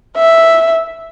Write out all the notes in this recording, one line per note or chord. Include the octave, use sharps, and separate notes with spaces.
E5